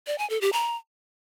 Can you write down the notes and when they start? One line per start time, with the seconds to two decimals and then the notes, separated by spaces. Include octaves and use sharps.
0.07 D5
0.18 G#5
0.30 A4
0.41 G4
0.53 A#5